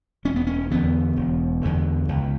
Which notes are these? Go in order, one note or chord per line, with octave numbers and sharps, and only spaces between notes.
E1 C#4
B3
C#4
E2 D3 B3
E1
E2 D3
C#2